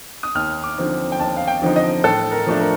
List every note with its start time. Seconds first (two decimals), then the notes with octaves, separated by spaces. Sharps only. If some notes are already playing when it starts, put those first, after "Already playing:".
0.23 D#6
0.35 D#2 F6
0.63 D6
0.78 D3 F3 C4 D#4
1.12 G5
1.19 D#2 A5
1.37 F5
1.48 G5
1.62 D3 F3 C4 D#4
1.76 D#5
2.04 A2 A4
2.32 A#4
2.47 F3 A3 D4
2.61 A#4